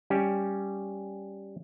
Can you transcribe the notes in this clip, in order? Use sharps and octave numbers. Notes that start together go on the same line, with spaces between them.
G3 C#4 G4